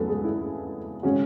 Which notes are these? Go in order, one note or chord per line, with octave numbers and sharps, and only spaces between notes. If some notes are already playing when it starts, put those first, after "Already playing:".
Already playing: E2 C#3 F#3 A3 B3 A4 B4
G#3 G#4
E4
C#3 G#3 C#4 F#4